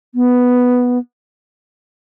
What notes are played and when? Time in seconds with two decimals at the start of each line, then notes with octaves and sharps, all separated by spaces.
0.15 B3